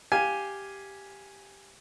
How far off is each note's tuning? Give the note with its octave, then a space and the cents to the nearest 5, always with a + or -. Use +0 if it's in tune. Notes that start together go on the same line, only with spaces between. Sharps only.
G4 +0 F5 +0 G#5 +0